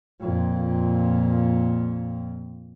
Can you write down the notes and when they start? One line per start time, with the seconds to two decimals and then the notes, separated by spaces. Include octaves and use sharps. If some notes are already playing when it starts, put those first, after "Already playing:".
0.20 F2 A#2